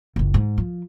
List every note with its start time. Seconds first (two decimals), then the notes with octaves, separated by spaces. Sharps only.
0.16 F#1 C#2
0.34 G#2
0.58 F3